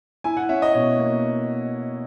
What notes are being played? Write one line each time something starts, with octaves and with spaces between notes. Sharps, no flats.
E4 G#5
F#5
C#4 E5
D#5
B2 C#5
A#3